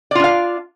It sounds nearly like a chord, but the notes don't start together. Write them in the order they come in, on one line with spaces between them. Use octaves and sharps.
D5 F4 D4 F5